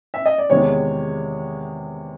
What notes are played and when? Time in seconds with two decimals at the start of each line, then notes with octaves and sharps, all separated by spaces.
0.14 E5
0.26 D#5
0.38 D5
0.50 E2 C3 D#3 G#3 C#5